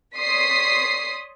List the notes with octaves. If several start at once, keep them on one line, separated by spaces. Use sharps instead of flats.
C#5 D5 C6 D#6 B6 C7